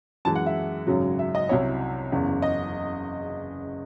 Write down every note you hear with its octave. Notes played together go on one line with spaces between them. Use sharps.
F#2 E3 G#3 A5
F#5
E5
G#1 F#2 C#3 F#3
E5
D#5
C2 C3 F#3 C#4 E4 C#5
F#1 E2 C#3
D#5